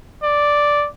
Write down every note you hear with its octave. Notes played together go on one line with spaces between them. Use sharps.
D5